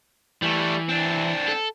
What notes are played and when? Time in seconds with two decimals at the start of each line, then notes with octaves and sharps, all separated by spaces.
0.42 E3 G3 A3
0.89 C4 D4
1.48 A4